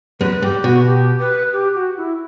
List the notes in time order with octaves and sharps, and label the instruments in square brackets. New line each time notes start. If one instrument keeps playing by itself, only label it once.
[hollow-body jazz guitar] F#2 [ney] B4
[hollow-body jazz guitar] G2 [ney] G4
[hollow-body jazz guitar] B2 [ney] F#4
[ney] G4
B4
G4
F#4
E4